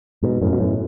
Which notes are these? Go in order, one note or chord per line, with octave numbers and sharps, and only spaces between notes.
G#2 B2
F#2 A2
B2
F#2 A2